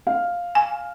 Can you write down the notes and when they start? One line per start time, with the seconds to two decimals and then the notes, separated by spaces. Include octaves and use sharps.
0.07 F5
0.55 G#5